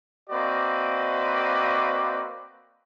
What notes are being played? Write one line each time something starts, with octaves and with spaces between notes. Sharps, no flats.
A#3 C4 F#4 B4 D5 D#5